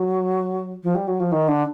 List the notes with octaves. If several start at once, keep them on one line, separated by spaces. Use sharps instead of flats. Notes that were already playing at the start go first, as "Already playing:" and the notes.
Already playing: F#3
F3
G3
F#3
F3
D#3
D3